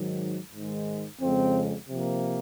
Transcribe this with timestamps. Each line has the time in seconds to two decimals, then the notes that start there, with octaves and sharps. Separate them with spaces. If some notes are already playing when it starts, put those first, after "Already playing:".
Already playing: G#2 D#3 F#3
0.52 G#2 D#3 G#3
1.21 F2 C#3 G#3 C4
1.89 C3 F3 A#3